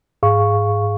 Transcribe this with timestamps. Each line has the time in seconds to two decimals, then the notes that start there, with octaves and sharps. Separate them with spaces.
0.23 G#2 G#4 F5 C#6